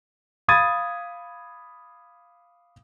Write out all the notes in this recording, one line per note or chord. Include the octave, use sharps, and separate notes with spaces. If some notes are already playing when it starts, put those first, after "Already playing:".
F5 B5 D#6 G#6 A6 D#7